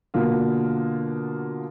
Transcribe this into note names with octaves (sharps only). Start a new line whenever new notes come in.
B2 D3 A#3 F4